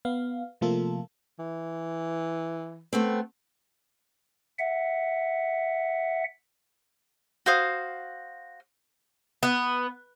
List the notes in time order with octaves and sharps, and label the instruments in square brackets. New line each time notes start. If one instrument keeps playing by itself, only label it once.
[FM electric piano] B3 F5
C3 F3 A3 A#3 F4 A4
[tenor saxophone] E3
[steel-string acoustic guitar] A3 B3 C4
[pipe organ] E5 F#5
[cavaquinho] F#4 C5 F5 D#6
[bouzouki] B3